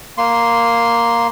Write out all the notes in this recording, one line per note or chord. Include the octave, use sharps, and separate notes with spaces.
A#3 C6